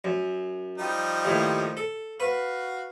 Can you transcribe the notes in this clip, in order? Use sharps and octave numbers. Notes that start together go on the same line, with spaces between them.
F#2
F3 G3 D#4
D#2 A2
A4
F#4 B4 F5